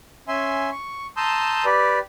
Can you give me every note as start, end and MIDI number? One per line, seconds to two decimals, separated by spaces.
0.28 0.70 61
0.28 0.70 76
0.28 0.70 80
0.28 0.70 84
0.72 1.07 85
1.17 1.65 81
1.17 1.65 82
1.17 1.65 84
1.17 1.65 87
1.17 1.65 88
1.17 1.65 91
1.65 1.99 67
1.65 1.99 71
1.65 1.99 74